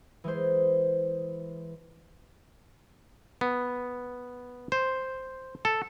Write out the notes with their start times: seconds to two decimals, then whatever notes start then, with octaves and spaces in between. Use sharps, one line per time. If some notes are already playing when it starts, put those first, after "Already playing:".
0.24 E3 G#3 C5
3.41 B3
4.72 C5
5.65 A4